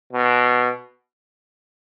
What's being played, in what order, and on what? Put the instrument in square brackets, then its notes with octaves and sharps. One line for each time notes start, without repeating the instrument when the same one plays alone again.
[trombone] B2